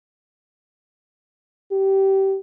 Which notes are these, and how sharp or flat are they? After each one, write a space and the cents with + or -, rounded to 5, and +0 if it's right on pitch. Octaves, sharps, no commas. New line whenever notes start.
G4 -20